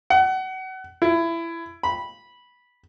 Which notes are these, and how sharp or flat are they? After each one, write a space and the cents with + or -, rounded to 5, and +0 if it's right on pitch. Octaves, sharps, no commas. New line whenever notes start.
F#5 +30
E4 +20
B5 -10